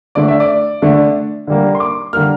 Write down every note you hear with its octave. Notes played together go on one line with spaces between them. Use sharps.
D3 A3 D4 D5
E5
D5
D3 A3 D4
D3 G3 A#3
C6
D6
D3 G3 A#3 F6